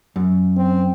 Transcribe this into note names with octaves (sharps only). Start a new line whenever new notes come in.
F#2
C4